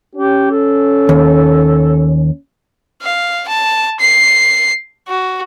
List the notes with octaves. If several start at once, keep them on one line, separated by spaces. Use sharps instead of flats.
C#4 G4
A4
D#2
F5
A5
C7
F#4